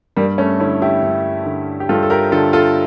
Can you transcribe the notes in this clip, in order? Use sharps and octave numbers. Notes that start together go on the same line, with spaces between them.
G2 G3 A#3
A3 C#4
D3 C#4 E4
E4 G4
G2
D3
G4
G2 F4 A4
A4
G4 A#4
D3 F4 A4
F4 A4